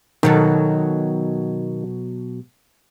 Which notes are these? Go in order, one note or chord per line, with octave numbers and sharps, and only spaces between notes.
B2 D#3 F#3 A4